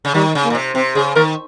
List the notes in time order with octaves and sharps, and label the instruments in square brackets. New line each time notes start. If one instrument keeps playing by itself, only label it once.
[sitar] C#3
[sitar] D#3 [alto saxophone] G3
[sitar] C#3
[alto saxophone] A#3
[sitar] A#2
C3
[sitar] C3 [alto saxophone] C4
[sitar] C#3 [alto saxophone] G#4
[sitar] D#3 [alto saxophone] A#4